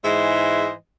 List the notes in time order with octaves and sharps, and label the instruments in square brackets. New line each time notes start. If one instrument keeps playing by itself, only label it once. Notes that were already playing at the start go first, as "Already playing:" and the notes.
[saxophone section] G#2 E3 G#3 C5 D#5 E5